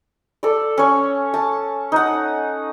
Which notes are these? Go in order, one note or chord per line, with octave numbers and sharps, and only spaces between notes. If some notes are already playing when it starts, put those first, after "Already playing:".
A4 D5
C#4 C#5
A5
D#4 F#5